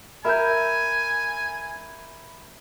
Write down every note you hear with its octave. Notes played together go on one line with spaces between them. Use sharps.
A#4 E5 G#5 B5 G6